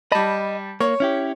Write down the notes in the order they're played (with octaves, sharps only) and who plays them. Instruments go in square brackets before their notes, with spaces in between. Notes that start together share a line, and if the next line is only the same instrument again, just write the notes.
[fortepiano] G3 A5 [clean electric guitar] D#5 B5
[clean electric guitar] A#3 [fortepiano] C#5
[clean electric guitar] C#4 E4 G4